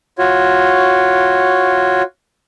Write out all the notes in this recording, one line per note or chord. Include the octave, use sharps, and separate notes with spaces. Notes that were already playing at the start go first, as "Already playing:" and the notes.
F4 F#4 C#5